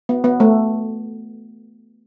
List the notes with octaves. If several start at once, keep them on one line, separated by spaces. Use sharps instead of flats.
B3
B3
A3